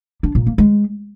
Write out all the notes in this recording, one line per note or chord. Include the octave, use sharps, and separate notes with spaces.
D4
A#2
A#3
G#3